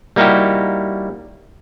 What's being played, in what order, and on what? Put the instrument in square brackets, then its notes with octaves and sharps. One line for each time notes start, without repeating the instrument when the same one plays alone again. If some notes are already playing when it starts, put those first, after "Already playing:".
[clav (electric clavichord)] G3 A#3 D#4 E4 F#4 G4